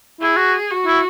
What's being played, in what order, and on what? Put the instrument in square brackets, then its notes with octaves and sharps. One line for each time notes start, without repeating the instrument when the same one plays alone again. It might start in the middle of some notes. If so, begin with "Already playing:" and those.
[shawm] E4 [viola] G#4
[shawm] F#4
[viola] F#4
[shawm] E4